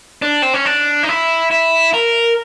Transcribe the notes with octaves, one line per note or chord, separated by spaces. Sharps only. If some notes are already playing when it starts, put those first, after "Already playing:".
D4
C4
C#4
D4
D#4
E4
E4
A#4